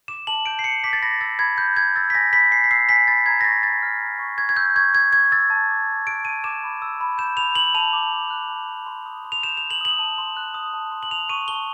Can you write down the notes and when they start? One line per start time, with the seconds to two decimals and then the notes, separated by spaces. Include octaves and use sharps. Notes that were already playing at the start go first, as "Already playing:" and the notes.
0.08 D6 E7
0.27 A5 F#7
0.46 G6 D7
0.59 C7
0.64 A5 C#7
0.84 D6 B6
0.93 A6
1.02 B5 A#6
1.21 E6 A6
1.39 B5 G#6
1.58 G6
1.76 B5 G#6
1.95 E6 A6
2.10 B6
2.15 G#5 A#6
2.33 B5 B6
2.51 G#5 C7
2.64 B6
2.71 E6 C7
2.89 G#5 B6
3.08 B5 A6
3.26 A#5 G#6
3.41 A#6
3.44 C#6 A6
3.63 A#5 A6
3.82 F6
4.02 A#5
4.19 C#6
4.38 C#6 G#6
4.49 G#6
4.57 E6 G6
4.76 C#6 G#6
4.94 G6 G#6
5.13 C#6 G#6
5.32 E6 A6
5.50 A5
5.70 D6
5.88 A5
6.07 F#6 D7
6.25 A5 D#7
6.44 D6 E7
6.63 B5
6.82 E6
7.01 B5
7.18 G6 E7
7.37 B5 F7
7.55 E6 F#7
7.74 A5 F7
7.93 D6
8.12 A5
8.30 F#6
8.50 A5
8.69 D6
8.87 C6
9.06 D#6
9.25 C6
9.32 F7
9.43 G6 E7
9.57 C6 F7
9.70 F#7
9.81 D#6 F#7
9.99 A5
10.18 C6
10.37 F#6
10.54 D#6
10.74 A5
10.92 C6
11.03 F#7
11.11 A5 F7
11.29 C#6 D#7
11.48 A5 G7